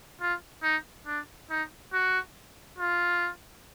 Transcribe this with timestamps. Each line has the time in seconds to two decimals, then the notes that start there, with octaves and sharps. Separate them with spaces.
0.21 F4
0.63 D#4
1.06 D4
1.50 D#4
1.93 F#4
2.78 F4